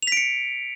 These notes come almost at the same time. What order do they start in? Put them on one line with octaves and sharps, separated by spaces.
F7 B6 D7 C#7